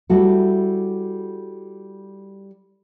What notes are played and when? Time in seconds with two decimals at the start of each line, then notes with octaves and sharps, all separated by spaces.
0.10 G3 E4 F#4 A4